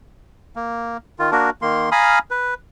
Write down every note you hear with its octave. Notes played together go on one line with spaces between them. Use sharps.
A#3
D#3 F4
A#3 D4 F#4 A#4
D#3 A#3 C6
F5 G#5 A#5 B5 D#6 F6
B4